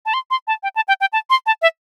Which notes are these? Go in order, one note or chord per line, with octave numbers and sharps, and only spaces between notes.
A5
C6
C6
A5
G5
A5
G5
G5
A5
C6
A5
E5